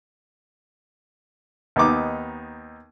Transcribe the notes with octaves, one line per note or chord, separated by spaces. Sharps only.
D#2 B3 D#4 D6